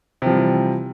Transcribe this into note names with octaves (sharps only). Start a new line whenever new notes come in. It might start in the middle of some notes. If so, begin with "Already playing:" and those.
C3 E3 F3 G3